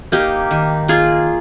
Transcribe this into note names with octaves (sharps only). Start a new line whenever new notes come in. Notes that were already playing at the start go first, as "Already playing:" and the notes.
A#3 D#4 G4
D#3
A#3 F4 G#4